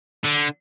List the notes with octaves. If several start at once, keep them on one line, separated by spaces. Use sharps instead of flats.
D3